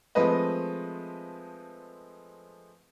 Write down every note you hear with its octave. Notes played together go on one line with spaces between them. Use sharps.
F3 G#3 A3 C4 B4 D#5